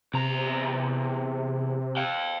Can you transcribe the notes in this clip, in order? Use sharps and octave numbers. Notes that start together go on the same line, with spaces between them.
E2 C3 A#5
F5 G5